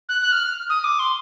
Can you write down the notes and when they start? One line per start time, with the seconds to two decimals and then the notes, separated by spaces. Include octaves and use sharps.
0.09 F#6
0.21 F#6
0.32 F6
0.70 D#6
0.84 D6
0.99 C6